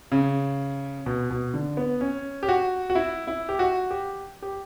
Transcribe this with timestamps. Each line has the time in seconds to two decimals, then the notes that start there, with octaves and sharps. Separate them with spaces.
0.12 C#3
1.06 B2
1.30 B2
1.54 D3
1.77 B3
2.01 C#4
2.43 G4
2.49 F#4
2.90 F#4
2.95 E4
3.27 E4
3.49 G4
3.59 F#4
3.91 G4
4.42 G4